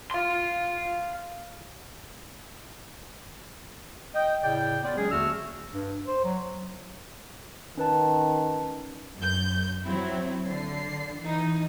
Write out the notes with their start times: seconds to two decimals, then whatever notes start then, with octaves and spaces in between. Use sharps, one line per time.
0.11 F5 C6
4.14 D#5 G5
4.43 A2 C#3 D5 G5
4.84 B3 F4 D5
4.97 F#3 G#3 C#4 G#4
5.11 D#2 D3 A3 F#4 E6 F6
5.74 G2
6.08 C5
6.25 F#3
7.77 D#3 C#4 B4 A5
9.17 F#2 G6
9.85 F#3 C4 E4
10.47 D3 C7
11.20 E3 D#4